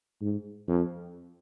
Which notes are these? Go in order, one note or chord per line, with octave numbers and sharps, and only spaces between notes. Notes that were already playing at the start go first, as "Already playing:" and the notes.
G#2
F2